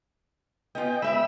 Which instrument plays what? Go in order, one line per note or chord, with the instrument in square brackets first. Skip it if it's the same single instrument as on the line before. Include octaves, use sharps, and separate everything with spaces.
[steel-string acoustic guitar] B3 C#4 F4 [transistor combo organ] D#5 G5
[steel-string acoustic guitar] G#3 E5 G5 [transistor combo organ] B5 E6